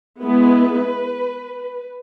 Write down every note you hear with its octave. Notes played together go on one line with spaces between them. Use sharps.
G#3 B3 E4 B4